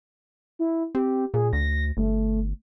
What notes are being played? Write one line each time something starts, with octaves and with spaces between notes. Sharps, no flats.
E4
C4 G4
A#2 G#4
D2 A#6
G1 A3